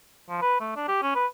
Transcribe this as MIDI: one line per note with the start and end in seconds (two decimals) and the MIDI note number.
0.29 0.41 53
0.42 0.59 71
0.60 0.75 57
0.76 0.85 62
0.88 1.02 67
1.03 1.12 61
1.15 1.26 71